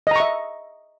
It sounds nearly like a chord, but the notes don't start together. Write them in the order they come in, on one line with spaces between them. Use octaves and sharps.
D#5 A#5 C#6 E5